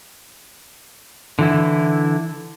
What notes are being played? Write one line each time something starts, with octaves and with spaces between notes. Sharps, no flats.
D3 E3 E4